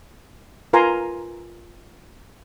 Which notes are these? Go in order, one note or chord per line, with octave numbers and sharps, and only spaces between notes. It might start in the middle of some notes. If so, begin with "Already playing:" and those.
F4 A#4 B4 G#5 A#5 C6